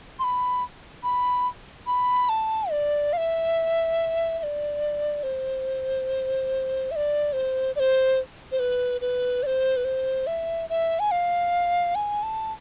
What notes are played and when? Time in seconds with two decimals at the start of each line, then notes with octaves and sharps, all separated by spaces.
0.19 C6
0.24 B5
1.03 B5
1.87 B5
2.29 A5
2.71 D5
3.13 F5
3.17 E5
4.39 E5
4.43 D5
5.23 C5
6.91 E5
6.96 D5
7.33 C5
7.76 D5
7.80 C5
8.52 C5
8.59 B4
9.01 B4
9.43 D5
9.46 C5
9.77 B4
9.85 C5
10.27 E5
10.70 E5
11.00 G#5
11.11 F5
11.95 G#5
12.23 A5